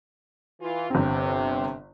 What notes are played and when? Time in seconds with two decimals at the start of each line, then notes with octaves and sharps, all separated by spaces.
0.61 E3 F4
0.90 G1 C3 C4